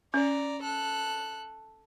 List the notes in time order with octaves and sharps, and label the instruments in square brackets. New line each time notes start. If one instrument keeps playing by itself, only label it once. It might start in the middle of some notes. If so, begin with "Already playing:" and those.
[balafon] C#4 [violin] D5 A#5
[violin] A4 F#6